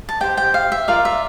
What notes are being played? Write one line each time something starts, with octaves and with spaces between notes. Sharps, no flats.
A5
G4 C5 G5
G5
F5
E5
F4 A#4 D5 F5
E5